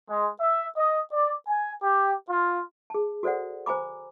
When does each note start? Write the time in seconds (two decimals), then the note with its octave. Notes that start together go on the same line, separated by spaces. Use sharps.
0.10 G#3
0.41 E5
0.77 D#5
1.12 D5
1.47 G#5
1.83 G4
2.30 F4
2.90 G#4 A5
3.23 F#4 A4 C5 D5 F#5
3.66 C5 G#5 A#5 B5 D6